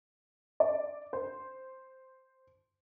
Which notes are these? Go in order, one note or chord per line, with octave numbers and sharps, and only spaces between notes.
D5
C5